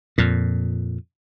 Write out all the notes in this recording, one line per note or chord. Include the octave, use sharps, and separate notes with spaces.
F2 A#2